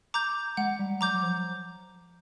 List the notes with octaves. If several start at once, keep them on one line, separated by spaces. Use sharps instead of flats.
A#5 D6 G6
G#3 F#5
G3
F#3 A#5 D6 G6
F#3
F3